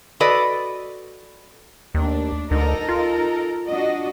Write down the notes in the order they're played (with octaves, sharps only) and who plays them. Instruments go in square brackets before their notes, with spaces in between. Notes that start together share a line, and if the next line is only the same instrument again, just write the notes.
[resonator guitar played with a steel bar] F#4 A4 B4 D5 D#5
[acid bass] D#2 [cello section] A3 D4
[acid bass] D2 [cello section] D#4 A4 A#4
[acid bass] F4
[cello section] D4 F#4 D#5